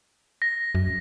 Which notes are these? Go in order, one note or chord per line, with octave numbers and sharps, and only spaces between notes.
A#6
F#2